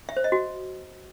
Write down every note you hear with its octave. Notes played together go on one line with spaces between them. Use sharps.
E5
C5
D#5
F#4